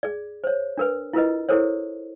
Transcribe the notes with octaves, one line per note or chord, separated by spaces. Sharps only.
G#4 D5
C5 C#5
D4 A#4 B4
E4 F4 A#4 B4 D#5
E4 G4 A4 A#4 C5 C#5